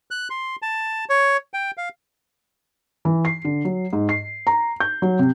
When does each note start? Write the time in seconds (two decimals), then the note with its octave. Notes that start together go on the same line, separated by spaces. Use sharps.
0.11 F#6
0.30 C6
0.62 A5
1.09 C#5
1.54 G5
1.77 F5
3.05 E3
3.25 C7
3.45 D3
3.65 F#3
3.93 G#2
4.09 C7
4.47 A#5
4.80 G6
5.02 F#3
5.19 C3